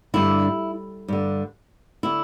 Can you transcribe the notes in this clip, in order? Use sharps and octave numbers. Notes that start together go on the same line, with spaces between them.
G2 D3 E4
G2 D3
D3 E4